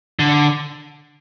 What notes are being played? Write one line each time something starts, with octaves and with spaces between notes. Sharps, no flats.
D3